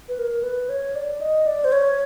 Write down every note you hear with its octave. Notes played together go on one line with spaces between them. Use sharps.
B4
A#4
B4
C#5
D5
D#5
D5
C5
C#5